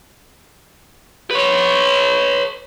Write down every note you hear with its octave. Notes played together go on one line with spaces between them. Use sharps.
B4 C#5